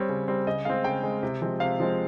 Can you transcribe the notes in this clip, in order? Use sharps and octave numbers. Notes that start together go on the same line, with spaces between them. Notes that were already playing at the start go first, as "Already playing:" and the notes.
Already playing: G3 C4 C#5
C#3
G3 C4
C#3 D#5
G#3 C4 F5
C#3 G5
G#3 C4
C3
F3 G#3 C4
C3 F5
F3 G#3 C4